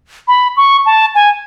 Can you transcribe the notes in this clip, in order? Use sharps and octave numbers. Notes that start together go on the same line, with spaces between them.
B5
C#6
A5
G#5